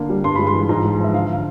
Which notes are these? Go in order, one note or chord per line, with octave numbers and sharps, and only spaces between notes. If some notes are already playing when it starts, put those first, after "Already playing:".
Already playing: D3 A#3
G3
G2 C6
G#3 B5
C6
E3
G#2 A#5
G#3
F3
E5
D3 F5
F5